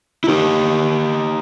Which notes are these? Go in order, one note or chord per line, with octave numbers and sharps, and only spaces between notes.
E4
D#4 G4